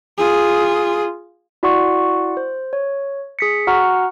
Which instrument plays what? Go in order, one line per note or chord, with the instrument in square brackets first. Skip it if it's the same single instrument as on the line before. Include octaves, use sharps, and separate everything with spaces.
[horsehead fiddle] F4 G#4
[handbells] E4 F#4 D5 F#5 C6 C#6
C5
C#5
G#4 B6 C#7
F#4 F#5 A#5 C#6 F6